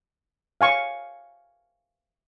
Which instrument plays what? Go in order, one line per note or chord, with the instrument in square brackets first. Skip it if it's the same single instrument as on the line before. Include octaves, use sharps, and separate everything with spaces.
[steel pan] F5 G#5 C#6